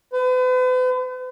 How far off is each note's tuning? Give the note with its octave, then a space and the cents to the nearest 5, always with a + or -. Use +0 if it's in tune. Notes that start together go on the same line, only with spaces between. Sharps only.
B4 +45